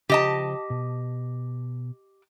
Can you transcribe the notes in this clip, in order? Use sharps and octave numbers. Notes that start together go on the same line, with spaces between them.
C#3 F3 G4 C5 D#5 A5
B2